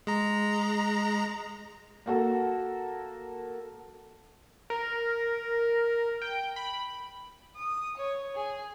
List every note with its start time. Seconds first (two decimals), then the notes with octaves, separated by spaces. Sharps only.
0.07 G#3 A#5
2.06 A#3 F#4 A4
4.70 A#4
6.22 G5
6.56 B5
7.56 D#6
7.97 C#5
8.35 G#4